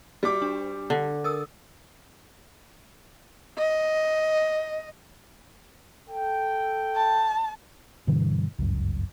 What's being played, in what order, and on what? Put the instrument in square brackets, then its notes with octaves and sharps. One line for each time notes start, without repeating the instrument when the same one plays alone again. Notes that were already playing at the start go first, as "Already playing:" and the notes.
[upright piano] G3 D6 [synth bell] F#4
[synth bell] D4
[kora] D3
[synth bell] A#4 D#6 E6
[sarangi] D#5
[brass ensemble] A4 G5
[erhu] A5
[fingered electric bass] G2 B2 D3 E3
G1 C#2 F#2